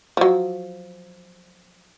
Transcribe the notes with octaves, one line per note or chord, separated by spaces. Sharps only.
F3 F#3